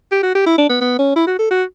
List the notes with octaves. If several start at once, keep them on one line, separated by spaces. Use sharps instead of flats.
G4
F#4
G4
E4
D4
B3
B3
C#4
E4
F#4
A4
F#4